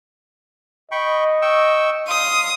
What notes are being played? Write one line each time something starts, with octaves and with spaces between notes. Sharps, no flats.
D#5 G5 B5 C#6
G5 C#6 E6
F5 C6 D#6